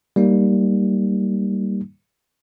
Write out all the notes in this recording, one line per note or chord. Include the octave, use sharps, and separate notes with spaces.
G3 A#3 D#4